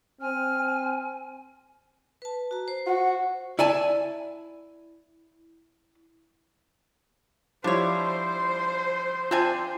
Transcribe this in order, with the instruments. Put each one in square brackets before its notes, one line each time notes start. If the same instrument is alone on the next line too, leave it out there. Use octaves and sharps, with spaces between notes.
[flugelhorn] C4 [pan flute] G#5 [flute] F6
[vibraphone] B4 A5
F#4 A#5
C5
[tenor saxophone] F#4 [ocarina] F#5
[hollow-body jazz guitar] E4 D5 G#5 A5
[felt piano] F3 G3 E4 [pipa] D4 C#5 [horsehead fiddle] C5
[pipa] C4 D4 G#5 [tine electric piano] F4